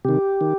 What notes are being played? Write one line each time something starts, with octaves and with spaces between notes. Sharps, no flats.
C3 D#3 G4
D#3